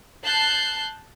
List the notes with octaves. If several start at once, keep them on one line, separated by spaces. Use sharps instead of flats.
A5 F#6 G6 C7